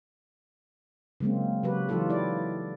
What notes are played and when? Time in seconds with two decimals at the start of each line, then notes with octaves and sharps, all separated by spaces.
1.20 C#3 F#3 G#3 A#3 C4
1.63 C#3 F#3 F#4 G4 B4
1.89 E3 F#3 D#4 F4 G4 A4
2.10 E4 D5